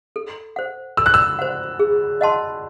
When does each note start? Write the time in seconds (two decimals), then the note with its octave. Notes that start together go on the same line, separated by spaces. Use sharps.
0.16 A4
0.56 C5 F#5
0.97 A4 E6
1.06 F#6
1.14 E6
1.39 C5 F#5
1.79 G#4
2.21 D#5 F#5 A5 C6